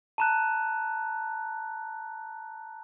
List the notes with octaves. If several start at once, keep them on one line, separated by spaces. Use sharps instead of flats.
A5 A#5 F#6